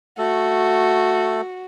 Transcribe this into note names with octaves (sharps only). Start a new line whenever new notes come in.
A3 F#4 A4